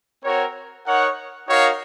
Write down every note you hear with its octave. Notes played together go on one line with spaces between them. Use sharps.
C4 F#4 A#4 C#5
D#4 A#4 C#5 F#5
D#4 F#4 A#4 C#5 F5